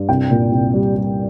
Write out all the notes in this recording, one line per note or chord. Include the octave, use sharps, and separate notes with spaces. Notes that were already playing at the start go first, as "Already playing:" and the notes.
Already playing: G2
C2 G5
A#2
C2
G3
G3